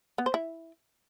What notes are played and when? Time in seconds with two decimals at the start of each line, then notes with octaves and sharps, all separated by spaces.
0.18 B3
0.26 C5
0.34 E4